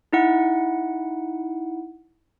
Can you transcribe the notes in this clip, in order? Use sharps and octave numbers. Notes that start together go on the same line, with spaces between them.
D#4 E4 F#5